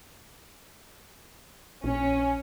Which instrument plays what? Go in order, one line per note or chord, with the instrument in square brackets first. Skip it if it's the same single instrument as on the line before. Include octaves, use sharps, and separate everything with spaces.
[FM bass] A#1 [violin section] C#4